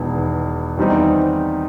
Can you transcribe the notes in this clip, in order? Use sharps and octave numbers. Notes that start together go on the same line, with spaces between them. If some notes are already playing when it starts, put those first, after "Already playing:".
Already playing: E1 E2 D#3
E2 D#3 G3 C4 D#4